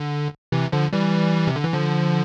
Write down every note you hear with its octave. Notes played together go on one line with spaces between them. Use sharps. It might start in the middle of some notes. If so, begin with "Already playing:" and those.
Already playing: D3
C3 E3
D3 F3
E3 G3
C3
D3
E3
D3 F3